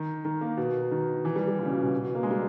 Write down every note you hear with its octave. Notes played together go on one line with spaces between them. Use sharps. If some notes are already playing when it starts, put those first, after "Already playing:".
Already playing: D#3
D#3
A#3
B2
D#3
E3
G3
G3
A#2
C#3
B2
C#3
B2
A#3
G#3
G3